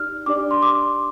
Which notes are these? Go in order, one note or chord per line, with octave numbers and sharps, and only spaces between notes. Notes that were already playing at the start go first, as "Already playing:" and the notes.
Already playing: D#4 G4 D5 F6
D4 G4 D5 D6
C6
D6